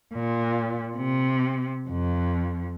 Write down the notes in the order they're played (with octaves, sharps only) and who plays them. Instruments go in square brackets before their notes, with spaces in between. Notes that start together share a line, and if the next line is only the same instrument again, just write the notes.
[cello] A#2
C3
F2